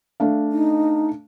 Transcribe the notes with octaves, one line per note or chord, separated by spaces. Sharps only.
A3 D4 F5
D#4